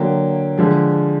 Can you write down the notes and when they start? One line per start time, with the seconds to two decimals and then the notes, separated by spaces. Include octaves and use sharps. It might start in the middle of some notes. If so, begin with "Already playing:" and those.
Already playing: D3 F#3 A#3 G5
0.58 D3 F3 G#3